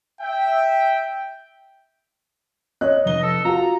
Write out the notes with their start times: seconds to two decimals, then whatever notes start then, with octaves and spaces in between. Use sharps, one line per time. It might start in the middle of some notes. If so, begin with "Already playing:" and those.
0.22 E5 G5
2.81 C#5 D#5 F#6
3.05 F1 D#5 G7
3.23 A4
3.45 F4 F#4 A#5